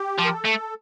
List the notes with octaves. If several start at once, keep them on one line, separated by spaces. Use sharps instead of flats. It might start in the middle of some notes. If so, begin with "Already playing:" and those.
Already playing: G4
F3
A#4
A4
A3